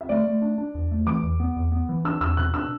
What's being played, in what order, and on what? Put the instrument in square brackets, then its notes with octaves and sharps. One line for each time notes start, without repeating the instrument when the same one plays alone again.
[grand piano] E5
[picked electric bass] A3 [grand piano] D5
[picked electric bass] A3
D4
D4
E2
A3
[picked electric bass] E3 [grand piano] D6
[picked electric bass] E2
B3
E2
B3
E3
[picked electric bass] D4 [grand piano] E6
[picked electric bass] E2 [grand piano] E6
[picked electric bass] B2 [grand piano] F#6
[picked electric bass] D4 [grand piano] E6